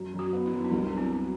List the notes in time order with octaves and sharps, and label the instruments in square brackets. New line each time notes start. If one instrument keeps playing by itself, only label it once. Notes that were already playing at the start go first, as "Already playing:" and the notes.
Already playing: [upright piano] F#2
F#2
[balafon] F#4
[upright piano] B3
[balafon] E4
[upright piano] F#2
[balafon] D4
[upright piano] C2 [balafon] E4
[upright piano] F#3 [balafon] D4
[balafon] C4
[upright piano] F#3